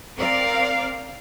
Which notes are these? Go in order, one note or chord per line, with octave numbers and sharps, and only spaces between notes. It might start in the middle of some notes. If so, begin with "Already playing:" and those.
C4 A#4 D5 F5